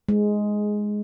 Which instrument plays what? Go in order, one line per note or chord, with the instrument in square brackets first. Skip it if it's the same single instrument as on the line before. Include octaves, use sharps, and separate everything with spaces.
[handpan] G#3